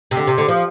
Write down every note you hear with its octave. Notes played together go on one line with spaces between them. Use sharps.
C3
D3
C3
D3
F3